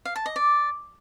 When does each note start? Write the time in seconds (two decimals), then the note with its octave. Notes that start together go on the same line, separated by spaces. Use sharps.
0.05 F5
0.16 A5
0.26 D#5
0.36 D5